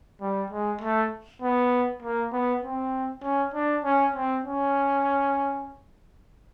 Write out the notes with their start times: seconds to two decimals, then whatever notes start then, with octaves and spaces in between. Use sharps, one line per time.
0.21 G3
0.50 G#3
0.81 A3
1.42 B3
2.03 A#3
2.32 B3
2.63 C4
3.23 C#4
3.54 D4
3.84 C#4
4.15 C4
4.44 C#4